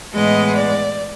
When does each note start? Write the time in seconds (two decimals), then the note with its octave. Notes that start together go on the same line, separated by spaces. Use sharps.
0.13 A2 E3 G#3 B3 D#5
0.55 D5